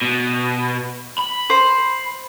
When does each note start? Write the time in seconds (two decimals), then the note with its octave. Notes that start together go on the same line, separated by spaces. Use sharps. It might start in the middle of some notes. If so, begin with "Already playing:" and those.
0.02 B2
1.18 B5
1.50 C5